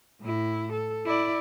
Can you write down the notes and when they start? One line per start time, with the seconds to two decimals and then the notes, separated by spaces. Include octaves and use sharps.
0.21 A2 E4
0.73 A4
1.06 E4 D5